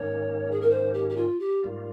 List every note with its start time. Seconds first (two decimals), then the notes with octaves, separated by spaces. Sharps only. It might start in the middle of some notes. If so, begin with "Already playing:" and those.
Already playing: G#2 D#3 A#3 C#4 C#5
0.51 G#4
0.61 A#4
0.70 C5
0.94 G4
1.09 G4
1.16 F4
1.40 G4
1.63 G#2 G3 A#3 F4